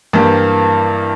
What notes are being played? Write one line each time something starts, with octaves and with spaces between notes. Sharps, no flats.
G2 E3 A#3 E4 G4